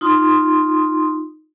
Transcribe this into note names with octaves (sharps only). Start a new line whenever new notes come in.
D#4 F4 C6 D#6